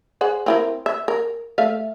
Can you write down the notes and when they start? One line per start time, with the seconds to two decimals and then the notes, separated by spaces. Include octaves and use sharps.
0.21 G#4 C5 F#5
0.46 C4 E4 A#4
0.86 E5
1.08 A#4
1.58 A3 E5 F5